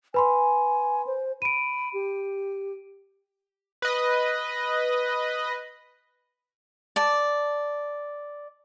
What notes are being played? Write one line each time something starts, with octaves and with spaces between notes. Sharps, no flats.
B4 G#5 B5 C6
C5
B5 D7 D#7
G4
B4 D#5
D5 A5